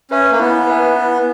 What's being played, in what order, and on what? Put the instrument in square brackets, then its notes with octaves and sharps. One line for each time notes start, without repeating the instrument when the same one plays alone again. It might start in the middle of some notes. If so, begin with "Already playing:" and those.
[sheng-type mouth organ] C#4 [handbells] B4 E5 G#5
[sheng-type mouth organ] A#3
[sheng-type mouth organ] B3 [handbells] E4
[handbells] B4 E5 G#5
E4